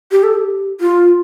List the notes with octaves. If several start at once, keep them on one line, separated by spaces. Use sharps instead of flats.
G4
A4
G4
F4